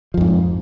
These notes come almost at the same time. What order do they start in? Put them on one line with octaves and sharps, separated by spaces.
F3 F2 G#2